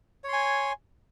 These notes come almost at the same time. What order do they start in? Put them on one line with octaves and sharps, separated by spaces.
C#5 C6 G#5